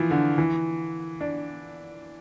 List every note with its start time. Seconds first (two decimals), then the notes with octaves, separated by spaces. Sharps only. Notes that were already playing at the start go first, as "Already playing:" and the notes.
Already playing: E3 F3
0.11 D3
0.38 E3
1.21 D4